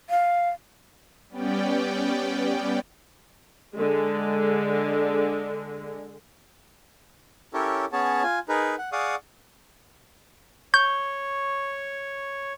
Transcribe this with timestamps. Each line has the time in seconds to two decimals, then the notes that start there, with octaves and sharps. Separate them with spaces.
0.10 F5
1.30 G3 B3 C#4 D5 G5
3.76 D3 G#3
7.54 C#4 E4 G4 A4 A#4 C#5
7.92 B3 C#4 G#4 C#5 A5
8.23 F4 G#5
8.49 D#4 G#4 A#4 B4
8.78 F#5
8.92 G#4 D5 F5 F#5 C#6 D#6
10.74 C#5 C#6 G6